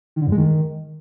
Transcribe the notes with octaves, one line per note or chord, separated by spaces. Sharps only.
D#3
D3
F#2
G#3
D#3